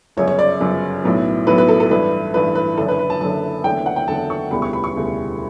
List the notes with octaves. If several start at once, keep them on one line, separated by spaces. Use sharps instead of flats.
G1 F#2 C#3 C#5
C#5
D5
G1 F#2 C#3
B1 A2 F#3 B3
B1 A2 F#3 B3 B4
B4
A4
A4
A1 G2 E3 A3 B4
A1 G2 E3 A3 B4
B4
F#1 F#2 D3 A4
B4
B4
A5
F#1 F#2 D3 A5
F#1 E2 D3 A3 G5
F#5
G5
F#1 E2 D3 A3 A5
C#6
E1 D2 C#3 G3 B3 B5
C#6
B5
C#6
E1 D2 C#3 G3 B3